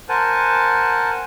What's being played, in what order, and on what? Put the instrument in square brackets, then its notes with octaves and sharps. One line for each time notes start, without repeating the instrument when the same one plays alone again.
[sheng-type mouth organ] A#4 C5 F#5 G#5 A5